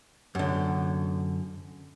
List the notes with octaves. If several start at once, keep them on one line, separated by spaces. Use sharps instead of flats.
F#2 D3